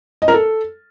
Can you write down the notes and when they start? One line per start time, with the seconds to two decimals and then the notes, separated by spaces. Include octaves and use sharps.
0.22 D#5
0.28 A#4
0.34 A4